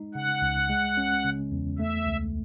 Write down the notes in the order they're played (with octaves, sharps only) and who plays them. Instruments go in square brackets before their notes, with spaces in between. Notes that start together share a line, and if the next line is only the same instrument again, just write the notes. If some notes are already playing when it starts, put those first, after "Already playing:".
Already playing: [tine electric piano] G#3 D#4
[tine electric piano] C#3 [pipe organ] F#5
[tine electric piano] C#2
G#3
C#4
C#3
E2
[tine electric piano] A3 [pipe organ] E5
[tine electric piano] C#2